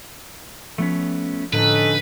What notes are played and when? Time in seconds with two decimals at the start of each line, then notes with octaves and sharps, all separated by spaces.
0.78 F3 A3 B3 C#4
1.53 A2 D3 F3 C#4 D#4 A4 B4